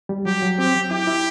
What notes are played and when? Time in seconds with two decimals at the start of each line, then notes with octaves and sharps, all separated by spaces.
0.09 G3
0.26 F#3 G4
0.42 F#3
0.58 C4 G4
0.75 F#3
0.91 E4 G4
1.07 E4